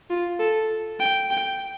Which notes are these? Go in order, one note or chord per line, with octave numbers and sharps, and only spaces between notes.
F4
A4
G5
G5